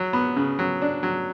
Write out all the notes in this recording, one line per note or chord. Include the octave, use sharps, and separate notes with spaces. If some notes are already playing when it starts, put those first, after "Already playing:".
Already playing: F#3
B3
C#3
F#3
D4
F#3